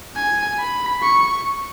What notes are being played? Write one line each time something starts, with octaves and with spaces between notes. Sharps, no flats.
G#5
B5
C#6